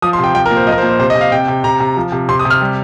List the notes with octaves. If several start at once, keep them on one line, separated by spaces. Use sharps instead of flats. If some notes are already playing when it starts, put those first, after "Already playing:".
F3 D#6
C6
C3 G5
F3 G5
A#4
A#2
C5
F3 D#5
A#4
C5
A#2
C5
C3 C5
D#5
C3
F5
C3 G5
C3
C3 A#5
C3
F3
C3
C3 C6
D#6
C3
F6
G3